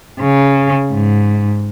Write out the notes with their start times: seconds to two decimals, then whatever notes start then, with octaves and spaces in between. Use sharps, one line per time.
0.21 C#3
0.93 G#2